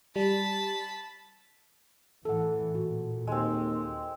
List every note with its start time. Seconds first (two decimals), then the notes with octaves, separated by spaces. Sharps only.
0.16 G3 A5 B5
2.25 A2 E3 A4 F#5
2.75 A#2 F#4
3.27 D#2 G#3 C4